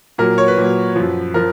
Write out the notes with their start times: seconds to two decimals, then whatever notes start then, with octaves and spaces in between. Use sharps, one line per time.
0.18 A#2 F#3 A#4
0.38 C#5
0.48 B4
0.57 A#2 F#3
0.96 F#2 F3
1.34 F3 A#4